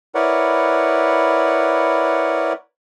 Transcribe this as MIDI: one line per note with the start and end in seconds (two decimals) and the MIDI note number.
0.15 2.53 64
0.15 2.53 70
0.15 2.53 71
0.15 2.53 73
0.15 2.53 74
0.15 2.53 78